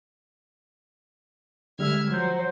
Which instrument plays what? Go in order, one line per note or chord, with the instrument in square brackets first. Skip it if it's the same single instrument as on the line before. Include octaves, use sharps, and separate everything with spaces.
[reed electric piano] D3 G3 G#3 [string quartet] E5 F6 G#6
[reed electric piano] F3 G6 [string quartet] F#3 C5